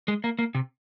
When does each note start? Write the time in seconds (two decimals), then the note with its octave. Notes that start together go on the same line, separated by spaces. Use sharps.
0.08 G#3
0.24 A#3
0.39 A#3
0.55 C3